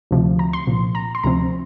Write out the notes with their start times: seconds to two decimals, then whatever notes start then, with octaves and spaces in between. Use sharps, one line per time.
0.11 D2 C3 F3
0.39 A#5
0.53 C6
0.67 C2 A#2 F3
0.95 A#5
1.15 C6
1.23 D2 C3 F3 C4 A#5